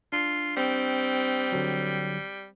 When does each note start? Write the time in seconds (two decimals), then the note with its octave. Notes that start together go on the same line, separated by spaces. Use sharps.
0.13 D4 F4
0.56 G3 C4
1.52 D3 F#3